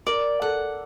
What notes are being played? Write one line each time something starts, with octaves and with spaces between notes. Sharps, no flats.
A#4 D5
A4 F#5